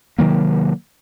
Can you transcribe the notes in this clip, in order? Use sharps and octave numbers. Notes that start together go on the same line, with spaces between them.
C3 D#3 F#3 A#3